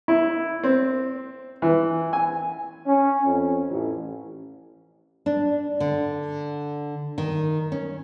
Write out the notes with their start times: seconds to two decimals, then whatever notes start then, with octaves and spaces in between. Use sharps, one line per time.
0.08 E4
0.64 C4
1.62 E3
2.13 G#5
2.87 C#4
3.26 F2
3.71 A1
5.26 D4
5.80 D3
7.18 D#3
7.72 C#4